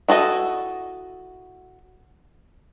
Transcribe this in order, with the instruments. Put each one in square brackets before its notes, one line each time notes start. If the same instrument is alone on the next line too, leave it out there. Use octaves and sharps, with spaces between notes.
[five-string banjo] E4 F#4 A4 D#5